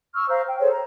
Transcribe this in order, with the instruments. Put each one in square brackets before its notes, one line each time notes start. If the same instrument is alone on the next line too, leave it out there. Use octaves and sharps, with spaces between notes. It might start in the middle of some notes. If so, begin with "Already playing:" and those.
[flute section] C#6 E6 F6
C5 F5 A#5
G5
G#4 A4 C5 C#5
A#5